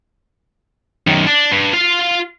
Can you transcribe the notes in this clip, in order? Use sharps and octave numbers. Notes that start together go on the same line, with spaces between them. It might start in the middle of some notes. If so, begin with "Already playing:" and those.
F#2 D#3
D4
G2
F4 F5